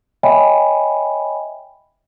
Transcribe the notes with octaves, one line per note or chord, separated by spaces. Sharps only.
C#5 D#5 E5 G5 G#5 B5